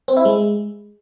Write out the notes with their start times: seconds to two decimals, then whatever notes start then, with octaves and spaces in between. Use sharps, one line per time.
0.08 C4
0.17 E4
0.25 G#3